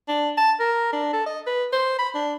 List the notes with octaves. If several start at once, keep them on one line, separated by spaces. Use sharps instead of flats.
D4
A5
A#4
D4
A4
D#5
B4
C5
B5
D4